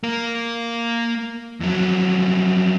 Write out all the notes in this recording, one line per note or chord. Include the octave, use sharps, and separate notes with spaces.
A#3 A#4
F2 F#3